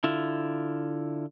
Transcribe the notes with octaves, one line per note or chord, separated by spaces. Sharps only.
D3 E4 F4